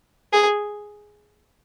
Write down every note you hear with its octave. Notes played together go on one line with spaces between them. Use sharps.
G#4